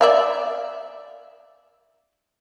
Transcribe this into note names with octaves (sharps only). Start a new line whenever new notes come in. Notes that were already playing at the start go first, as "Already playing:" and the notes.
D5 E5 F5